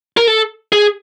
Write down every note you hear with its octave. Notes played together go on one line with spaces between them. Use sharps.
A#4
A4
G#4